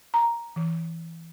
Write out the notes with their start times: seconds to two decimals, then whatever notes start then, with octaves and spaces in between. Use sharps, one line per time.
0.14 A#5
0.56 E3